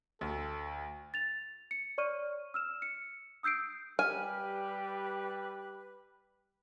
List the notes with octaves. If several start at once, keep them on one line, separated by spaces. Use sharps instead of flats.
D2 A4
A6 F7
C#7
C#5 D5 C#6 F6 D#7
E6 F6 E7
C#7
D#6 E6 G6 C7 D7
G3 G4 B4 G#5 F6